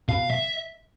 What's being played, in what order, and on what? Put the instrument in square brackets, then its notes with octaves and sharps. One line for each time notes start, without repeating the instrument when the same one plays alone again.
[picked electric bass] B2 [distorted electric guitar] F5
[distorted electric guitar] E5